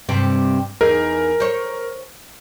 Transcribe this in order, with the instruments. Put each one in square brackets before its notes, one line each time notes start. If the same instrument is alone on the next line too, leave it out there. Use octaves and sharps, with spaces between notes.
[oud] G2 C3 C4
[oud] E2 D#4 G#4 [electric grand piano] A#4
[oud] C5 C#5